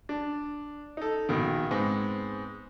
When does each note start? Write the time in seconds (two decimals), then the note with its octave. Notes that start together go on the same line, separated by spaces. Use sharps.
0.09 D4
0.97 D#4 A4
1.29 A#1 B2 D#3
1.71 G#2 G#3 B3 C4